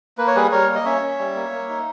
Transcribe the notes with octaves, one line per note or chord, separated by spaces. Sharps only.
A#3 B4
C#5
G3 G#4 B4
G3 A#4 C#5
A#3
D#5
C#4 C#5 E5
C#4
G3
A#3
A#3
D#4